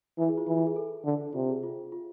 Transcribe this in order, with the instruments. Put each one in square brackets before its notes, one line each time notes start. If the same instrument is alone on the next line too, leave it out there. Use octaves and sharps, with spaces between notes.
[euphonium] E3 [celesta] E4
[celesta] G#4
F4
[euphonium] E3 [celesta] F4
[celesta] F4
G#4
A4
[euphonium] D3
[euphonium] C3 [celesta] F4
[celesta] G#4
F4
F4